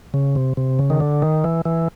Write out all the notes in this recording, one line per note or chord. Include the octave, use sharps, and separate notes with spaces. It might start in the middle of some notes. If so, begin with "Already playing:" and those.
C#3
C3
C3
C#3
D#3
D3
D#3
E3
E3